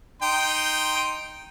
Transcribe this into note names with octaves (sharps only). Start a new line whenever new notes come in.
D#4 G5 C6